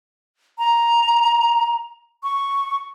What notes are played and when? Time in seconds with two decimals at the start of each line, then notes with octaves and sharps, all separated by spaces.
0.58 A#5
2.23 C#6